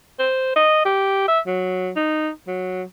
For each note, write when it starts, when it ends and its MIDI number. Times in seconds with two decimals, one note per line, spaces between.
0.19 0.52 72
0.56 0.85 75
0.85 1.24 67
1.28 1.39 76
1.46 1.91 54
1.96 2.31 63
2.47 2.83 54